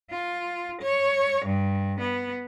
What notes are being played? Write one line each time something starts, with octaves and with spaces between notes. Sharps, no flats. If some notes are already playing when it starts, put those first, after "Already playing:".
F4
C#5
G2
B3